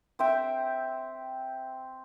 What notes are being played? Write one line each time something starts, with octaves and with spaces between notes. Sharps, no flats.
C4 E5 G5